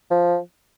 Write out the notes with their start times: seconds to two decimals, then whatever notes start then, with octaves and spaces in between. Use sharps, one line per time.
0.11 F3